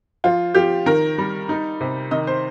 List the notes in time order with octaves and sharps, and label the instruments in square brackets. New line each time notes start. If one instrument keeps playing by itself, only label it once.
[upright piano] F3 F4
F3 G4
D#3 A#4
G3
D#4
C3
D#3 D#5
C5